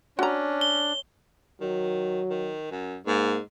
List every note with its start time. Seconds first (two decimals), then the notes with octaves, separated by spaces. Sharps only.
0.19 C#4 D4 F#4 A#5
0.61 G7
1.61 D#3 F#3
2.30 D#3
2.71 F#2
3.07 G#2 A#3